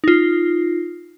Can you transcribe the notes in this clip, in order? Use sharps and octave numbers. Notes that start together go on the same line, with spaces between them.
D#4 F4